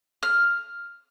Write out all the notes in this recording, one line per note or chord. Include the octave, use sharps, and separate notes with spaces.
F6